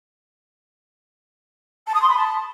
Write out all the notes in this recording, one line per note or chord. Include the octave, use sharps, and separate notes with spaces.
A5
D#6
C6
B5
A5